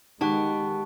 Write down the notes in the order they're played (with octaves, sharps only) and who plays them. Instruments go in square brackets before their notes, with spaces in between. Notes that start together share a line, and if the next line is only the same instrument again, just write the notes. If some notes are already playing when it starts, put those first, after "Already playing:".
[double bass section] D#3 G#3 [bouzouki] B3 G4 [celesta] D#4 [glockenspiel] A5 C#6 F#6